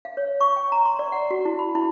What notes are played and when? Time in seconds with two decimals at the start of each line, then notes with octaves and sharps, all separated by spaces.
0.05 F5
0.17 C#5
0.41 C#6
0.56 G5
0.72 A#5
0.85 C6
0.99 D5
1.12 F#5
1.31 F#4
1.45 E4
1.59 B5
1.75 E4